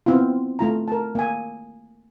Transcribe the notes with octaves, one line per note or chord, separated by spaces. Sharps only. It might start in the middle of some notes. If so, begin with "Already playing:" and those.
B3 C4 E4 F4
A3 F4 A#5
A#4 A5
A#3 G#5